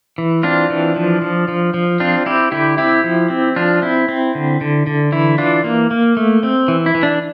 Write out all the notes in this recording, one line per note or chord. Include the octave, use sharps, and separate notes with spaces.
E3
C4 D4 F4
E3
F3
F3
F3
F3
C4 D4 F4
C4 E4 G4
D3 E4 G4
C4 E4 G4
F3
C4
F3 D4 F4
C4 E4
C4
D3
D3
D3
E3 E4
E3 D4 F4
A#3
A#3
A3
C4
E3
E4
E3
D4